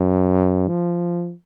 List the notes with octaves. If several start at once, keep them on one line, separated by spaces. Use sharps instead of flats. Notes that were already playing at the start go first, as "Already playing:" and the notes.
Already playing: F#2
F3